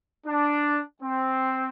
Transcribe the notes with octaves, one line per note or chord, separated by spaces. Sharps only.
D4
C4